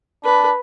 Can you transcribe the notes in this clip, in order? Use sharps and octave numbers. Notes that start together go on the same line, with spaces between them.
D4 B4